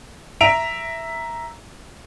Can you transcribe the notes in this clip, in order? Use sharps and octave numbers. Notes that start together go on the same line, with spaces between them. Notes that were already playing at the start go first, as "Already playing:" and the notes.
E5 A#5 D7 F7